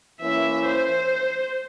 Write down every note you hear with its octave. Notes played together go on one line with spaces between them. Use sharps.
E3 A#3 C#4 E4 E5
C5